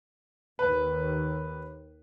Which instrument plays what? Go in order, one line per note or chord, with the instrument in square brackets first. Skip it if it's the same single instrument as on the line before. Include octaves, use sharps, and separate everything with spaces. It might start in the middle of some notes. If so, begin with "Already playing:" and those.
[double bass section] D#2 [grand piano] B4